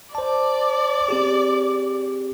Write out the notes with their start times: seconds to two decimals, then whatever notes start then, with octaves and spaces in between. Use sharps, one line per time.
0.15 C5 D5 A5
1.08 C4 G4 G#4